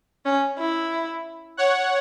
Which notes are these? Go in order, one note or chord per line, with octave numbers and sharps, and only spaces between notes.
C#4
E4
C#5 F#5